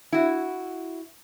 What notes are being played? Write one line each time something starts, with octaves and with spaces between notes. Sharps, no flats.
E4 F#4